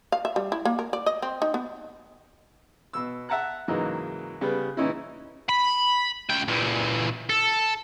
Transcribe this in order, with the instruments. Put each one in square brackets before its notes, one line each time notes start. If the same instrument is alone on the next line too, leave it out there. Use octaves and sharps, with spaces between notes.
[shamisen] F5
E5
G3
E4
A#3
A#4
D5
D#5
C4
D#4
B3
[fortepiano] B2 E6
E5 F#5 A5 A#5 F#6
G#2 C#3 E3 F#3 A#3 D#5
C#3 G3 B3
A#2 E3 C#4 D#4 E4
[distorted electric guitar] B5
C#2 G5
A#2 E3
A4